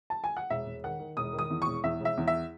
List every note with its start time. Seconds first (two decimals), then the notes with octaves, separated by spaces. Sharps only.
0.10 A5
0.24 G#5
0.37 F#5
0.50 E1 E5
0.66 E1
0.84 D#3 F#5
0.99 D#3
1.17 E1 D#6
1.33 D#3
1.39 D#6
1.50 E2
1.62 C#6
1.67 E1
1.83 E2 E5
2.00 E1 E5
2.17 E2
2.27 E5